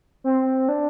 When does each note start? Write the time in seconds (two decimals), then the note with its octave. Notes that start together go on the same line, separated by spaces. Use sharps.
0.24 C4
0.69 D4